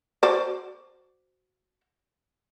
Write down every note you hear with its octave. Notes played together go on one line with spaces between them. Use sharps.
F#4 C5 D5